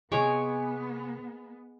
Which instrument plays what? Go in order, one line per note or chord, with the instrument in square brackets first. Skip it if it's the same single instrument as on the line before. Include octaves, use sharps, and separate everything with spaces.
[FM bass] C3 [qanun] G#3 [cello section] B3 [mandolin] C#5 G#5 D6